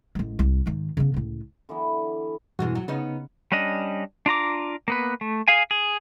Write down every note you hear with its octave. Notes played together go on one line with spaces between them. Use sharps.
A1 G#3
C2
G#2 D#3
C#3 B3
C#2 A2
D3 E3 F#3 B3
E2 G2 B2 E3 G#3 F#4
F#3
C#3 B3 C#4 D#4
G3 C#4 D4 D#5
D4 F4 A#5 D6
A#3 B3 B4
A3
G#4 F5 G#5
G#4